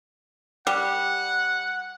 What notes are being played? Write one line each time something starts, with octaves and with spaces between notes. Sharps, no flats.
G3 F#5